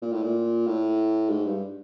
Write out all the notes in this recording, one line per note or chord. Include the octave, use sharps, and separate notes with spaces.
A#2
A2
A#2
A2
G#2
G2